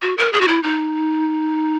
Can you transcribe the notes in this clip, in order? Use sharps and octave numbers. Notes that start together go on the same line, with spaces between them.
F#4
A#4
G#4
F#4
E4
D#4